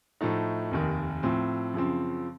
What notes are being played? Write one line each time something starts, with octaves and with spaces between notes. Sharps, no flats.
A2 F3 A3 D#4
F1 D#2 D#3
A2 F3 C4
F#2 C#3 F3 C4